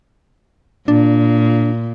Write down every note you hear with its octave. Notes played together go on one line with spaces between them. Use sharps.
A#2 D4